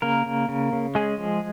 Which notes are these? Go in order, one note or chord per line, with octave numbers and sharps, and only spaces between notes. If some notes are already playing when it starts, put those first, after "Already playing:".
C#3 A#3 A#4
C#3
C#3
C#3
G#3 C#4 G#4
F3